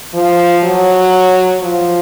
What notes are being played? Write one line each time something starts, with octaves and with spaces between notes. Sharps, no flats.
F3
F#3
F3